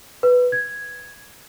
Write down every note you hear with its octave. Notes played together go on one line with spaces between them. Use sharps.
B4
G#6